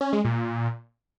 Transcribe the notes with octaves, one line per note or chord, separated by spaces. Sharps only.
C#4
G#3
A#2